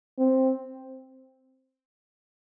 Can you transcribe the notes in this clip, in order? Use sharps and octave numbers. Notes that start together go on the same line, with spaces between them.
C4